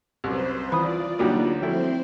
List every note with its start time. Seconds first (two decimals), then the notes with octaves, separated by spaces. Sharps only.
0.24 C2 F#2 G4 B4 C5
0.72 E3 F4 D5 B5 D#6
1.19 D2 F#3 G3 A#3 D#4 F#4
1.62 F3 A3 C4 E4 F#4 C5 G5